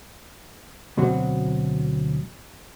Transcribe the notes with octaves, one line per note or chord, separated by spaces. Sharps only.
D2 B2 F#3 C4 F#4